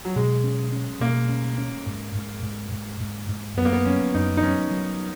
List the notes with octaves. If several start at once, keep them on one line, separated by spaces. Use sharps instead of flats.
F#3
B2 G#3
C#4
C#4
B2 A#3
C#4
C#4
G#2
G#2
G#2
G#2
G#2
G#2
F#2 B3
A#3
B3
F#3 C#4
F#2 D#4
D#4
F#3 C#4
F#3